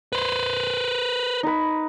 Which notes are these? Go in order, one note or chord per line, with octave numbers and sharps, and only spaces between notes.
B4 C5
D#4 B4